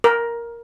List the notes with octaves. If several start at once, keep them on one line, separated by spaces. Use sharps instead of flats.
A#4